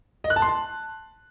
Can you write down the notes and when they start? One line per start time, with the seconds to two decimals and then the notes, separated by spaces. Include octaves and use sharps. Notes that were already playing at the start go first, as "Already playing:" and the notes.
0.24 D#5
0.30 F#6
0.36 A5
0.42 C6
0.48 A5